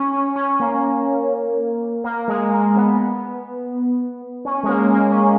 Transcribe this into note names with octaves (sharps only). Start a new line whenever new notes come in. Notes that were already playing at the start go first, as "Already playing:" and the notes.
Already playing: C#4
C#4
C#4
A#3
A#3
G#3
A#3
B3
C#4
G#3
A#3
A#3
C#4